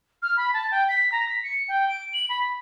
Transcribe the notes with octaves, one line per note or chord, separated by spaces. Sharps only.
F6
B5
A5
G5
B6
A#5
B6
C#7
G5
D7
F#7
B5